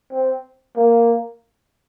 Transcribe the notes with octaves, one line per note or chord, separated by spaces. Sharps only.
C4
A#3